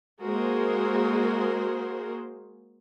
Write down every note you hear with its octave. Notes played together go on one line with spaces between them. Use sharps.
G#3 A#3 F#4 G#4 A#4 C5